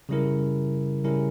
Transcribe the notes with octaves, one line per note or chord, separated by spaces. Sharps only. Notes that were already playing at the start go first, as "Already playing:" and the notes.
C#3 G3 C#4 E4 A#4
C#3 G3 C#4 E4 A#4